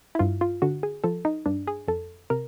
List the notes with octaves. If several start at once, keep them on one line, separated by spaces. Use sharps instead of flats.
E4
G2 F4
F4
D3 F#4
G#4
F3 A4
D#4
G2 D4
G#4
F2 A4
C3 A#4